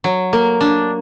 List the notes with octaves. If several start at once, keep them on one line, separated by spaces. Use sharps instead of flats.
F#3
A#3
D4